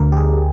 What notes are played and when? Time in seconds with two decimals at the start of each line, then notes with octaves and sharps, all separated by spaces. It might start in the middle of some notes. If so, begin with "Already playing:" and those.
Already playing: D2 D3 A#4
0.12 G4
0.17 G#4